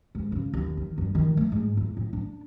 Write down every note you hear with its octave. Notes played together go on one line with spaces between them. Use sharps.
G#2
C#3
D#2
D#3
G2
D#3
A3
G#2
E2
A2
D4